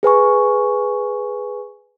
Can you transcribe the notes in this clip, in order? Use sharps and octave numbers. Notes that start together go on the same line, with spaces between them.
G#4 B4 G#5 C#6